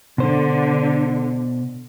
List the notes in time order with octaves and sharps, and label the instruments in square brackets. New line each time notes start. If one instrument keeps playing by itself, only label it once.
[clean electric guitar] B2 C5 [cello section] D3